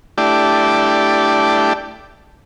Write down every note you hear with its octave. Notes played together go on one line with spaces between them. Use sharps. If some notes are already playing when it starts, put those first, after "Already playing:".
A3 D4 E4 G4 D5